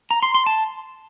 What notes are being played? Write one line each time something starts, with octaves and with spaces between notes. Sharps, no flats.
A#5
C6
C6
A5